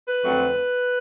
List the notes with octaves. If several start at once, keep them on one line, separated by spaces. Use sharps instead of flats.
B4
F2 D3 F#3 A3 C4